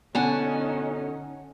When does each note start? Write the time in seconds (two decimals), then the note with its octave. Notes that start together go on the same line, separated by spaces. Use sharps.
0.15 B2 D3 C#4 D#4 F#5 G#5 A5